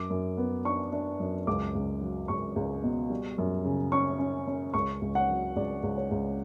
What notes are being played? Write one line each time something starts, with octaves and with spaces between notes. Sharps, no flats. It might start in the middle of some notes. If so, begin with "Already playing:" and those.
Already playing: F#2 D6
F#2
B3
D4 C#6
D4
F#2
C#2 D6
C#2
F#3
C#2 C#6
C#2
B2
G3
F#2
C#3
C#4 C#6
C#4
C#4
C#2 C#6
C#2
F#5
F#3
C#2 D5
C#2
C#5
C#2